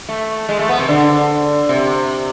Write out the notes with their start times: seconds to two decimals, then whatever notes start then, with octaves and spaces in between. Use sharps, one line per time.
0.09 A3
0.49 G#3
0.59 A3
0.69 B3
0.79 C3
0.89 D3
1.69 C3